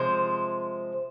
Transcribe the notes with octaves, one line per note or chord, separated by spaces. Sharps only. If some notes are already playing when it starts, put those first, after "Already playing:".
Already playing: C3 F3 G#3 C5